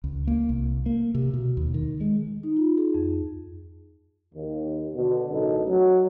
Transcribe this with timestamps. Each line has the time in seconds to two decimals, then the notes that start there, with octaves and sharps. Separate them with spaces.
0.04 C#2
0.27 A#3
0.49 C2
0.86 A#3
1.14 C3
1.34 B2
1.57 D#2
1.74 D#3
2.01 G#3
2.43 D#4
2.57 F4
2.78 G#4
2.94 F2
4.35 D#2
4.95 B2 D3
5.31 A1 F#2 D#4 A4
5.68 F#3